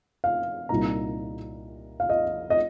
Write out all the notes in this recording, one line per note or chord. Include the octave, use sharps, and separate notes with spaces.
F5
C2 A#2 G3 A#3 D#4 A#5
F5
D#5
D#5